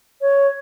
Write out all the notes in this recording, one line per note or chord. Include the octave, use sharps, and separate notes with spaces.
C#5